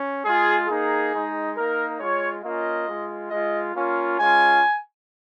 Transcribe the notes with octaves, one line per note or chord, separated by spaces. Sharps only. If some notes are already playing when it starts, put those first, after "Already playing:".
Already playing: C#4
G#3 F4 G#4
A#3 D#4 G#4
G#3 D#4
A#3 D#4 A#4
G#3 F4 C#5
A#3 C#4 F4 D#5
G#3 F4
G#3 F4 D#5
A#3 C#4 F4
G#3 C#4 F4 G#5